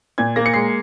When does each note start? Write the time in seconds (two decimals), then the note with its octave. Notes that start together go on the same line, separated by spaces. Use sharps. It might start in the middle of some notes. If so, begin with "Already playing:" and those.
0.18 A#2 G#6
0.36 A#3 A#6
0.46 C#7
0.54 G#3 C7